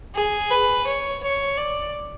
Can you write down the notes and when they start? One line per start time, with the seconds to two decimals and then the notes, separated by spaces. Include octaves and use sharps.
0.15 G#4
0.51 B4
0.87 C#5
1.22 C#5
1.57 D5